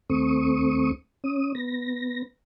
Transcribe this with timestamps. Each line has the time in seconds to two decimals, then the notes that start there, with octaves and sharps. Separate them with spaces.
0.10 D#2 A3 C4 C#6 D#6
1.24 C#4 D#6
1.55 B3 A#6